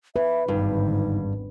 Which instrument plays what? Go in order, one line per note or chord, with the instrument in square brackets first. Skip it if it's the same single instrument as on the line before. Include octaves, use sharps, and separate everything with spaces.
[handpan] B4 [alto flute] E5
[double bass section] G#1 E2 D3 [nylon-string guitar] G2 [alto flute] D#4